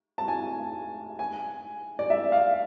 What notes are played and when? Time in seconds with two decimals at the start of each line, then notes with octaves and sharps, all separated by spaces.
0.18 A5
0.28 G#5
1.19 G#5
1.99 D5
2.10 E5
2.32 F5